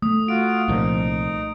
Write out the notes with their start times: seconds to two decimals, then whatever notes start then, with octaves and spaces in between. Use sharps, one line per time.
0.02 A3 D#6
0.28 F4 F#4 D7
0.68 C2 A#2 F3 D#4